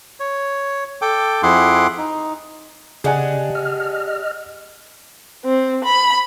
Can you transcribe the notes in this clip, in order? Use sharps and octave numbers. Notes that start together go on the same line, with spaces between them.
C#5
A4 G5 D6
F2 E4 G#4 F#5 C6 D6
D#4
C#3 G#3 D4 G4 G#4 F#5 G#5
D#5 F6
C4
B5